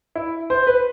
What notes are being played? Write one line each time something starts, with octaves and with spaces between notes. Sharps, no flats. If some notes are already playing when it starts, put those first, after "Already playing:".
E4
C5
B4